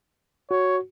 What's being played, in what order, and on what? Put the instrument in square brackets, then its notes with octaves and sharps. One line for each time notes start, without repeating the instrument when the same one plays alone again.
[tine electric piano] F#4 [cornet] C#5